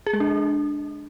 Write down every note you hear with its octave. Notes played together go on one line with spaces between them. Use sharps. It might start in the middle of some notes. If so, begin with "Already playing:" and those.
G#4
G#3
D4